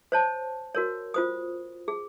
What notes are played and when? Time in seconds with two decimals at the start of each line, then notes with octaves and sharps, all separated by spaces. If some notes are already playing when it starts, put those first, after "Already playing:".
0.12 C5 C#5 A5
0.75 F#4 A#4 C#5
1.14 F4 C5 D#6
1.88 G#4